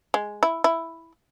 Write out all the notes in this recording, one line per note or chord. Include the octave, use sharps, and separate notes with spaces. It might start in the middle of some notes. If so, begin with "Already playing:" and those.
G#3
E4
E4